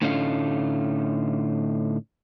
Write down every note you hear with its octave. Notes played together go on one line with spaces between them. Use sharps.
A2 D3 A3 C#4 D#4 F4